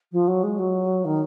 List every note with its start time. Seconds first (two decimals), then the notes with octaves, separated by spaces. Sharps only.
0.12 F3
0.27 F#3
0.43 G#3
0.58 F#3
1.04 D#3